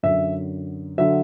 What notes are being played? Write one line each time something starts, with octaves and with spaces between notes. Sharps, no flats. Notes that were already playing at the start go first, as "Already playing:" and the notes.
F#2 D3 F#3 E5
D3 F#3 E5